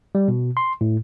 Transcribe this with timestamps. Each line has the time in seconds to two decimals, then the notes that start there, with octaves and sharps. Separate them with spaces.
0.15 G3
0.28 B2
0.57 C6
0.81 A2